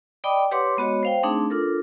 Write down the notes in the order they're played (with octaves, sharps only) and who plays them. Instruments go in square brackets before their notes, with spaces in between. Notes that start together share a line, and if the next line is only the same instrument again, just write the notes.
[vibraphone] D5 D#5 G5 B5 D6 D#6
G4 B4 C#5 F#5 C6 D6
G#3 B3 F#4 C#5 D#5
C5 F5 G5
A3 C4 D4 D#4 G#4
D4 F4 A4 A#4